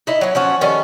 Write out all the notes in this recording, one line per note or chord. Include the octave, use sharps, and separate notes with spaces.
D#4 E4 D#5
F#3 C#4
F3 C#4 F#4
D#3 G3 C#4 A4